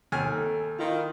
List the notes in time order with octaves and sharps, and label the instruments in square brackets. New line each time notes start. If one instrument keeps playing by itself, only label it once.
[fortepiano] D#2 G#5 F6 [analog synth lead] A4
[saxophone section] D#3 F4 [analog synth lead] E4